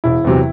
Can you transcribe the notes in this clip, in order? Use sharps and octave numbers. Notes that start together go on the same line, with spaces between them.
E1 E4
E2 C3 F#3